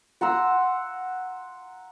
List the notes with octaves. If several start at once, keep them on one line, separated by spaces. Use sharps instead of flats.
F#5 A#5 C6 E6